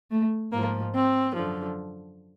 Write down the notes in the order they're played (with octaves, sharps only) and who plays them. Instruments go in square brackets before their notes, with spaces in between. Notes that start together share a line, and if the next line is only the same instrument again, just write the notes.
[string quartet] A3
G#2 F3 A#3
C4
F#2 D3 F3